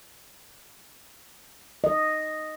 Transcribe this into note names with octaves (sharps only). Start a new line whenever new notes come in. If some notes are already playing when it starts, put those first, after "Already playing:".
D#5